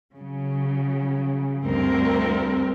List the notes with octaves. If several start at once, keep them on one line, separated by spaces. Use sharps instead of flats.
C#3 F#3
D2 G2 C4 A#4